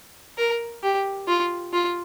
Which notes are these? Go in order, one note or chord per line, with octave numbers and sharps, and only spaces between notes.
A#4
G4
F4
F4